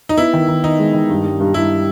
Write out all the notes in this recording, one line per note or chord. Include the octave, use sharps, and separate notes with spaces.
D#4
B3 E4
D#3
D#3
D#3 D#4
G#3
D#3
G2
G3
G2
G3 E4